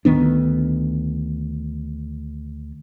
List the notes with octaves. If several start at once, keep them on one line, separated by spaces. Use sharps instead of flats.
D2 D#3 B3 D4